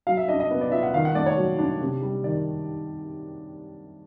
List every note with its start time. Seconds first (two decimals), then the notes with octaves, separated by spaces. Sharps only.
0.07 F#3 F5
0.17 E5
0.29 D4 D#5
0.40 D#5
0.51 B3
0.61 D5
0.72 F4 E5
0.83 F#5
0.93 D#3 F5
1.05 F#5
1.15 A3 D5
1.26 C#5
1.37 F#3
1.59 D4
1.81 C3
2.02 G3
2.24 D#3 D5